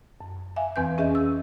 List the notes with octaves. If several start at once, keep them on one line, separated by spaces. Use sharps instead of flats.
F#2
E5 F5 G#5
F2 E3 C4 B4 G#5 G6
C#4 G#4 D#5 E5
E6